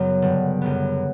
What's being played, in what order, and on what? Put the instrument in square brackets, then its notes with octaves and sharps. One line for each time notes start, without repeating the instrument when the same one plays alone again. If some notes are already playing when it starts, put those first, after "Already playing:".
Already playing: [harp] F#2 C#3 F#3 B3
G1
F#2 C#3 F#3 B3